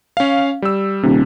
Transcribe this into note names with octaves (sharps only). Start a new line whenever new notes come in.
C#4 F5
G3 E6
D#1 C3